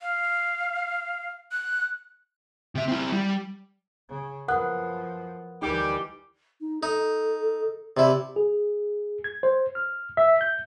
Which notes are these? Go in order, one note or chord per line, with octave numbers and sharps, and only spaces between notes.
F5
F#6
C3 E5
C4 E4
G3
C#3
F#2 F3 A#4 B4 F#5 D#6 F#6
D2 E3 G3 D#4 G4 A#4
D#4
D#4 A4
C3 E4 D5
G#4
G#6
C5
F6
E5
G6